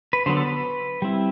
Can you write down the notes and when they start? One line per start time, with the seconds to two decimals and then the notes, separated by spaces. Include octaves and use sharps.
0.13 B4
0.26 D3 F#3 B3 C5
0.37 A4
0.45 B4
1.02 G3 C4 E4